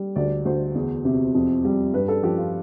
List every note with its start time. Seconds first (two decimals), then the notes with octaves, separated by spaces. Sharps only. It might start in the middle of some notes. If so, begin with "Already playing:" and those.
Already playing: G3
0.16 D2 D5
0.45 D2 C5
0.75 E2
1.05 C3
1.34 F2
1.65 G3
1.94 G2 B4
2.08 A4
2.23 F3 G4
2.38 F4